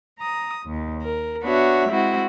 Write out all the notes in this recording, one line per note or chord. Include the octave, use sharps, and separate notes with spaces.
A#5 D#6
D#2
A#4
B3 D4 F#4 C#5 E5
G#3 C4 E4 F#4